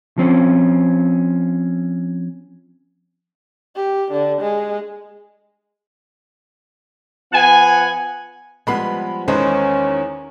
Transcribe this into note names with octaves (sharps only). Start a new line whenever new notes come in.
F3 C4 C#4
G4
D3
G#3
F3 B3 F#5 G#5
F3 G3 G#3 B3 B5 C7
E2 D#3 G#3 B3 C#4 C5